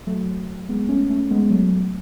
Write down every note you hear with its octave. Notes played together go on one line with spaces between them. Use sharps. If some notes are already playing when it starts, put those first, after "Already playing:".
F#3 A3
G#3 B3
A3 C#4
A3 C#4
G#3 B3
F#3 A3